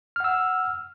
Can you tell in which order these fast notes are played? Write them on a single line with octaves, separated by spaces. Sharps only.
F6 F#5 E6